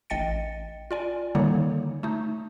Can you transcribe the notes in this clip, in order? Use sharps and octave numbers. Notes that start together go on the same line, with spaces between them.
A1 D#5 G5 A6 C#7
F4 D5 G#5
D3 D#3 G3 A#3 D#4 C#5
A3 D#4